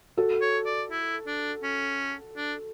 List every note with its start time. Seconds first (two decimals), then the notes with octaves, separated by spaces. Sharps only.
0.17 F#4 A4
0.41 C#5
0.66 D5
0.91 E4
1.27 D4
1.63 C#4
2.37 D4